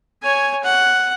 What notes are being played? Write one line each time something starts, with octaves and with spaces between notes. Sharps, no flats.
C#5 G#5
F#5